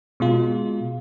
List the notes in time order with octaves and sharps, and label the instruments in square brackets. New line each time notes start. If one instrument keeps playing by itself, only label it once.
[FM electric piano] B2 G#3 F4